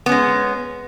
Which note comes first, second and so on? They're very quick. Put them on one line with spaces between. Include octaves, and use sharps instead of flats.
B3 C#4 G#3